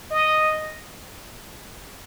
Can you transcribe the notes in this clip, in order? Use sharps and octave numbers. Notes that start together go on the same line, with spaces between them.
D#5